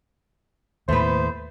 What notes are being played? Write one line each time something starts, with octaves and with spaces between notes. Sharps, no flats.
D#2 A2 A3 B3 B4 C5